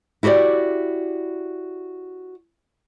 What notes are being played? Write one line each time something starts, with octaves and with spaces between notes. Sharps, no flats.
E4 F#4 G4 B4 D5